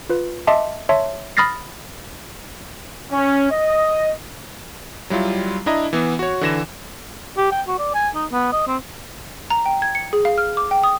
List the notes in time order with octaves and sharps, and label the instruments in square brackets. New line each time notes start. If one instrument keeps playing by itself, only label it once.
[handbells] F4 B4
D#5 E5 A5 C6 D6
C#5 E5 A5 C6
B5 D#6 F6 A6 A#6 C7
[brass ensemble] C#4
D#5
[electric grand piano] F#3 G3 E4 F4
D4 E4 D#5 A#5
E3 B3
F#4 C#5
D3 E3 A#6 E7
[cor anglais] G4
G5
F#4
D5
G#5
D#4
B3
D#5
C4
[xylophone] A#5
G5
G#6
C#7
G#4
F5
F6
D6
G5
D#6